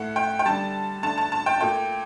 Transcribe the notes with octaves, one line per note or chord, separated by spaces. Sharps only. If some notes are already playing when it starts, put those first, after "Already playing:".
Already playing: A2 A3 F#5
G5
G5
D3 G3 A5
D3 A3 A5
A5
A5
G5
A#2 A3 G5